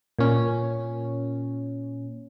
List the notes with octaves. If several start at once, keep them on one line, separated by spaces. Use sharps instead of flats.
A#2 C#4